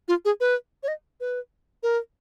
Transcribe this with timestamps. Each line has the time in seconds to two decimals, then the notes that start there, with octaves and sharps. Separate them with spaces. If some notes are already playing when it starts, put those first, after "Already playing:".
0.08 F4
0.25 G#4
0.40 B4
0.83 C#5
0.88 D#5
1.20 B4
1.83 A#4